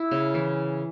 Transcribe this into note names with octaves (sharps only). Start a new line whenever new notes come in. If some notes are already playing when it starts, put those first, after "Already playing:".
Already playing: E4
C#3
E3